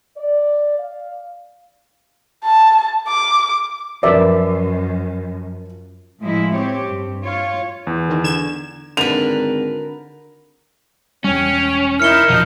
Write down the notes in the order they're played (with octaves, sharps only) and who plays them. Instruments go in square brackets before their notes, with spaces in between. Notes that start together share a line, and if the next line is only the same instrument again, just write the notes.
[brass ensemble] D5
F5
[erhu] A5
D6
[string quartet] F#2 [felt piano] F3 A#4 B4 [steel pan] D5 E5
[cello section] A2 F3 G#3 E4
C4 G4 C#5
G2
F4 C#5
[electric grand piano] E2
[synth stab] D#3
D3 G#6 E7
[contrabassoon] G#1 [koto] D3 [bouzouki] A#4 B4 [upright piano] F7
[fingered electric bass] E1 G3 [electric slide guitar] C#4 [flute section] C#5 G5
[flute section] D#4 E4 A#4 [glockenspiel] F6 C#7 G7
[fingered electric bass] E2 B2 [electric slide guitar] F3 [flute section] D#4